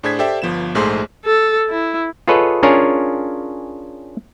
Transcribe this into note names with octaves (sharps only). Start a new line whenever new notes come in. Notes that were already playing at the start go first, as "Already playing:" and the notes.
A2 D4 G#4 C5 G#6 B6
G4 A4 C5 D5 E5 G5
G1 F3 B3 E7
A#1 G#2 A3 G#4 C5 C6
A4
E4
F4 G#4 A4 B4 C#5 D#5
C#4 D4 F4 G#4 A#4 C#5